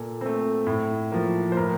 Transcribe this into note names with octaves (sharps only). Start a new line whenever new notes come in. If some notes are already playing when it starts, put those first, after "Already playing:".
Already playing: A#2 A4
A3 C4
A2
F3 A#3
C5
A2 A#4